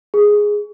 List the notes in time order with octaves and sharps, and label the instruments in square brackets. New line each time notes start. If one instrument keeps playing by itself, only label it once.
[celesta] G#4